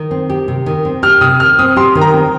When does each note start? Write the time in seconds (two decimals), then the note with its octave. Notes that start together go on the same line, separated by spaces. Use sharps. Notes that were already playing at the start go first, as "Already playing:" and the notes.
Already playing: D#3
0.11 C4
0.30 G4
0.48 C3
0.66 D#3
0.85 C4
1.03 G4 F6
1.21 C3 D#6
1.40 D#3 F6
1.59 C4 D#6
1.76 G4 C6
1.95 D#3
2.01 A#5
2.13 C4